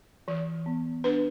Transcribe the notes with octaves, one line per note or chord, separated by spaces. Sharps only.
E3
B3
D4 B4